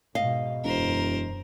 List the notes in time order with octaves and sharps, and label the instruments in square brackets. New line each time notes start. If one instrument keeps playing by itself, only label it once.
[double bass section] G#2 B2 [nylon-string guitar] D#5 F5
[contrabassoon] E1 [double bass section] F#2 [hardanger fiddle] A#4 C5